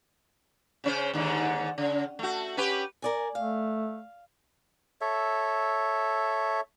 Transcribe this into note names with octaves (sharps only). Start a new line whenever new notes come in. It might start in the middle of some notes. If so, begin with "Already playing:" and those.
C#3 C#4 C5
D#2 G#2 D3
C#3
A3 F#4
C#4 G4 B4
A#4 D5 G#5
A3 F5
A4 C#5 E5